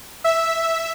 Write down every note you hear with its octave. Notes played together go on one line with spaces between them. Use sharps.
E5 E6